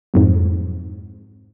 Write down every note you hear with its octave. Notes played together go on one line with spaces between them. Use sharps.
B1 F2 G#2